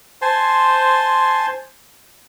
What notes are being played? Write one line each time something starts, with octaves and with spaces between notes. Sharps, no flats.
C5 G#5 A5 C6